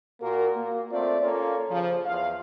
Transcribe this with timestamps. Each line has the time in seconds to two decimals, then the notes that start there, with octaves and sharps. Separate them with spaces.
0.21 A#2 A#3 F#4 A#4
0.56 A#3
0.90 A3 C4 F4 D5
1.21 A#3 C#4 F4 A4 C#5
1.69 C#3 F3
2.06 E2 F4 F5